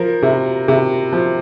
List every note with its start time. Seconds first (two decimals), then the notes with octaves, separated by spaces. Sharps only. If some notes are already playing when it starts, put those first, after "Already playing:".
Already playing: F3 A#4
0.22 C3
0.68 C3
1.12 F3